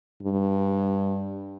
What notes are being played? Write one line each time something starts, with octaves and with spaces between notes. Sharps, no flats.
G2